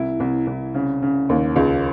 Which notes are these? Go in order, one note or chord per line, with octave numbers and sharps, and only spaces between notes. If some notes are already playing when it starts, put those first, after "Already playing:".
Already playing: C2 E4
C2
C2
C#3
C#3
D#2
C#2